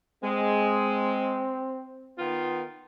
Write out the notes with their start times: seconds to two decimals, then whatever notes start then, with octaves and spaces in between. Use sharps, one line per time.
0.24 G#3 C4
2.18 D#3 B3 F4